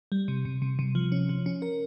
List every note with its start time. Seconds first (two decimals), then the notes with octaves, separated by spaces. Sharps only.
0.12 G3
0.28 C3
0.45 C3
0.62 C3
0.79 C3
0.95 F3
1.12 C#4
1.29 F3
1.46 C#4
1.62 A#4